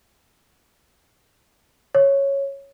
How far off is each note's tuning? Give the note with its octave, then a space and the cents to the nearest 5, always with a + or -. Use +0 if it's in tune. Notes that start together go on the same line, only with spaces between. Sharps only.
C#5 -5